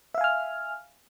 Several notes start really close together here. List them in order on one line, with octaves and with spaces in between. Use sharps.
E5 F5 G#5 F6